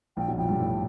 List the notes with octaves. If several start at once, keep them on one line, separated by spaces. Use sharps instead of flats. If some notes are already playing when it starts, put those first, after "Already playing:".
A#1 A#2 G5
B1 B2
F2 F3 G5
G2 G3
A2 A3